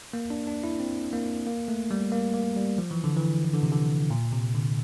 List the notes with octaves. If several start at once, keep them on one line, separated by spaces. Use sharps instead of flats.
A#3
D4
D4
E4
C4
A#3
A#3
A3
G3
A#3
A#3
G3
F3
E3
D3
E3
E3
D3
C3
D3
A#2
C3
D3